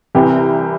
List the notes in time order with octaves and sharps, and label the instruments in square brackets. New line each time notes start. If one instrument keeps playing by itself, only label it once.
[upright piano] C2 C3 E3 G4